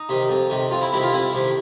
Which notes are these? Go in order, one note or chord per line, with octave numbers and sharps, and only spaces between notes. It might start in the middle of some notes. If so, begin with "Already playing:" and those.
Already playing: D#4
C3 D#3
F2
C3 D#3
F2 F4
E4
C3 D#3 E4
F4
F2 E4
C3 D#3